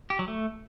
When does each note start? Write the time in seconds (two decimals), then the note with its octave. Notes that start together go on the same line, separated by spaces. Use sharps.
0.10 G4
0.19 F#3
0.28 A3